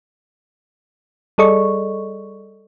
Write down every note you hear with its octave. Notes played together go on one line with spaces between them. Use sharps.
G3 G#4 A4 D5 D#5 C#6